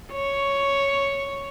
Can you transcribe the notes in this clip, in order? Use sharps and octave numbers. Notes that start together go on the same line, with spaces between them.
C#5